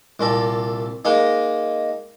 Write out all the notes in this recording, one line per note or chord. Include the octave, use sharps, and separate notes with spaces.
C2 A#2 A4
G#3 A#3 D#4